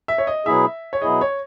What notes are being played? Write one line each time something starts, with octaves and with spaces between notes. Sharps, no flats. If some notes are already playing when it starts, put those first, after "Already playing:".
E5
C#5
D#5
B2 F#3 B3 E4 G#4 E5
C#5
B2 F#3 B3 E4 G#4 D#5
C#5